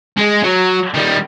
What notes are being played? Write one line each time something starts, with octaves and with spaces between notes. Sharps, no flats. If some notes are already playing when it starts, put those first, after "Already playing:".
G#3
F#3
D#3 G3